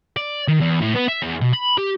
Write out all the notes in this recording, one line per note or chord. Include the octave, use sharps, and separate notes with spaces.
D5
D#3
E2
A2
B3
E5
E2
B2
B5
G4